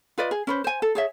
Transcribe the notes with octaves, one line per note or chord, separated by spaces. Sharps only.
F4 B4 D5 D#5
G#4
C#4 B4 C5
C5 G#5
A4
G#4 C#5 E5